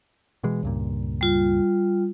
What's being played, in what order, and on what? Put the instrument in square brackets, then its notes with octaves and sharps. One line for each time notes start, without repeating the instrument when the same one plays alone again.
[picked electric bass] B2 E3 G#3
C#2 G2 A#2
[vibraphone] G3 F4